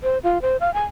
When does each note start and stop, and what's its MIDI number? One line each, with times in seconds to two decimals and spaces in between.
0.03 0.18 72
0.23 0.41 65
0.42 0.57 72
0.60 0.72 77
0.74 0.83 80